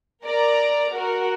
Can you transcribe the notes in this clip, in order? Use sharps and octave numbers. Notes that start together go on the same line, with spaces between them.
A#4 D5 A#5
F#4 A#4